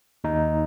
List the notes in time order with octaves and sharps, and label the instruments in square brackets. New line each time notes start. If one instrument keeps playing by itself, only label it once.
[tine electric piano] D#2 D#4